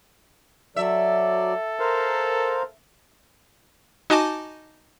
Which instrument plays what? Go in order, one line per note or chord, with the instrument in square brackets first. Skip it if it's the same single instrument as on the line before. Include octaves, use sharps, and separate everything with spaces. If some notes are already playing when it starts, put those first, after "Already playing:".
[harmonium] F#3 D5 [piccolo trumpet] A4 [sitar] E5
[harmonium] A#4 C5 F5
[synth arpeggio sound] D#4 F#4 D#5 G#5 A5 D6